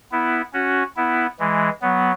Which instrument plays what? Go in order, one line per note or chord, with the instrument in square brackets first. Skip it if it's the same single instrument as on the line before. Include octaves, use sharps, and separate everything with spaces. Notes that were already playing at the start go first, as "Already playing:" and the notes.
[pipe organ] B3 E4
C#4 F#4
B3 E4
E3 G#3
F#3 B3